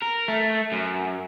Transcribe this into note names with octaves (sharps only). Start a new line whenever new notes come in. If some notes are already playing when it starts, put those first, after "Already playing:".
A#4
A3
F#2